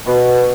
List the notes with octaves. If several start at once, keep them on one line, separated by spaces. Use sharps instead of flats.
B2